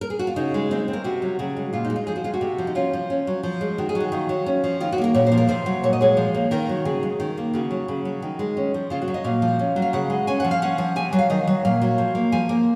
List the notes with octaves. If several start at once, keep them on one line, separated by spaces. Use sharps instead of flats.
A#4
G#4
F#4
F4
C#3 D#4
G#3
C4 D#4
C4
A#4
C3 F#4
F#3
C#3 F#4
G#3
A#2 F4
D#4
G#3
F4
F3 G#4
F#4
G#3 F4
F#4
C3
F3
D#4
C#4 F4
F3
C#4
F#3
F3
G#3
D#3 F#4
G#4
F#3
F#4
D#3 F4
F#3
C#4
F3
D#3 F4
F#4
A#3
A#4
A#2 C#5
C5
F3
A#4
C3 C5
F#3
A#2 C#5
D#5
G#3 C#5
F3
A#3
D#3 A#4
F#3
C#3 G#4
G#3
D#3
A#3
C#3 F#4
F#3
C#3
F#3
D#3
G#3
C#4
F3
C#3 F4
F#4
F#3
D#5
A#2 F5
F3
C#4
F#3
F5
C#3 F#5
G#3
C#4 G#5
F3 F#5
F5
C#4 F#5
F3
C3 G#5
F#3
F5
D#3 D#5
F#3
A#2 F5
F#3
F3
A#3
F3 G#5
A#3